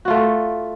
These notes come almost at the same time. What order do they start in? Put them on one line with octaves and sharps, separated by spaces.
F#4 F4 A3